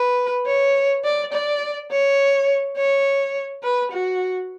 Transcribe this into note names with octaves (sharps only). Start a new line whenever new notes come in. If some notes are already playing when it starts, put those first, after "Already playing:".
Already playing: B4
C#5
D5
D5
C#5
C#5
B4
F#4